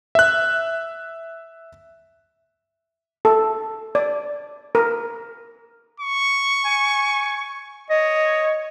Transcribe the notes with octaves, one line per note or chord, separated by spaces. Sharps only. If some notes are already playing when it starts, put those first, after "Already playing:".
E5 F#6
A4
D5
A#4
C#6
G#5
C#5 D#5